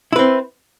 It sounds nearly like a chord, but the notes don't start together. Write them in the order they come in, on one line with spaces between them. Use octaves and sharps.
E4 B4 C4